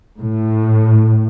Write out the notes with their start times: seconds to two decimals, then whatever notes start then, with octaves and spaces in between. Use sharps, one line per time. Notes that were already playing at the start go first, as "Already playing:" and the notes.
0.19 A2